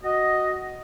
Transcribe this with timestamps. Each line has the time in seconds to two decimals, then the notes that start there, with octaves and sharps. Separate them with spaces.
0.03 F#4 D#5